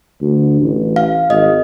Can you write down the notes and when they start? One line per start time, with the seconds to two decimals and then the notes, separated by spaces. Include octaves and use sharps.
0.21 D2
0.62 A1
0.96 F5
1.30 G#1 D#5